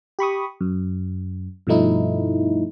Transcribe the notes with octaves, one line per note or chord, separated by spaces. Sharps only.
G4 B5 C#6 D#6
F#2
G2 B2 F3 A3 D#4 E4